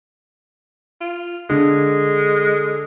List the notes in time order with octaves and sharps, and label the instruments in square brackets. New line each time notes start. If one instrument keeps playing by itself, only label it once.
[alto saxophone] F4
[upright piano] D3 [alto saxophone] G#3